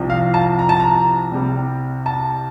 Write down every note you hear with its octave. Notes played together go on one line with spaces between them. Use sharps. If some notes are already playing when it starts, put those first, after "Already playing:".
Already playing: C2 C3 F3
F5
A5
A#5
A5
A#5
C2 C3 G3
A5